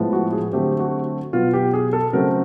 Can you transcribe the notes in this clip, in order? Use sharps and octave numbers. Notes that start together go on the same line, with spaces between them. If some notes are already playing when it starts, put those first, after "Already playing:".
Already playing: A2 F3 G#3 B3
F#4
G#4
D3 F#3 A3 C4 G4
F#4
B2 F#3 B3 F4
G4
G#4
A4
C#3 F#3 A3 C4 A#4